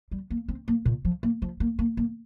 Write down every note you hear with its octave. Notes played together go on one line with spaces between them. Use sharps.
G3
A#3
C4
A#3
A#2
F3
A#3
F3
A#3
A#3
A#3